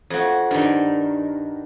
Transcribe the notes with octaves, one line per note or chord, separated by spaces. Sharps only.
F2 F#4
G2 D#3